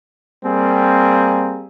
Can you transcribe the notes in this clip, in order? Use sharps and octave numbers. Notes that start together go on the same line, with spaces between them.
G3 A#3 C4 G#4